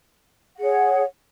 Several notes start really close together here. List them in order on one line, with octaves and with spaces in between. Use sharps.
F#5 G#4 C#5